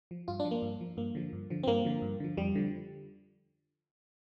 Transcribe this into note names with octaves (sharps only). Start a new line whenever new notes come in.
F3
G2 F4
D4
F3
A#3
G2
F3
G2 A#3
D3 F3
G2
D3 F3
C4
G2 A#3
D3 F3
G2
D3 F3
F2 G3
D3 F3